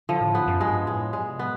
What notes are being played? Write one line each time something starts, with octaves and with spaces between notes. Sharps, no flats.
D3 F3
A2
G#2 B3
F#2
G2 G#3
A2 G#3
A#2 G#3
C3
B3